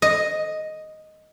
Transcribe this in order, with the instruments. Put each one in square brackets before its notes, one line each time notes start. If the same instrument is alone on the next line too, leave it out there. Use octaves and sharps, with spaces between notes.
[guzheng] D#5